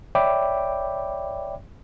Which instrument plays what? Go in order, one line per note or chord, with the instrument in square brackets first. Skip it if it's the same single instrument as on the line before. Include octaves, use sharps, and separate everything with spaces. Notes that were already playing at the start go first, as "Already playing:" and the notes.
[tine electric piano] C#5 D5 E5 G5 B5 D6